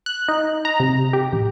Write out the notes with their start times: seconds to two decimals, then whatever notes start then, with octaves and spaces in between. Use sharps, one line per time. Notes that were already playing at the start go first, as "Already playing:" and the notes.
0.06 F#6
0.28 D#4
0.65 A#5
0.80 C3
1.13 G4
1.33 A1